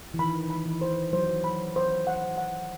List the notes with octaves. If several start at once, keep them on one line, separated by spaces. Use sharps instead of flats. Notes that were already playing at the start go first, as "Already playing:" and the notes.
E3
D#3 B5
B5
E3
C5
F#3 C5
B5
C5
F#5
F#5